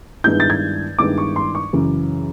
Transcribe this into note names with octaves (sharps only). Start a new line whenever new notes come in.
G2 D#3 G#3 B3 E4 G6
A6
G#6
G2 D#3 G#3 B3 E4 D6
C#6
C6
C#6
F#2 C#3 E3